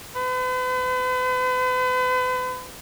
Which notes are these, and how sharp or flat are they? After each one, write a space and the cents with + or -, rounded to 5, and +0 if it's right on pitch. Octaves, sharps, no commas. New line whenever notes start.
B4 +40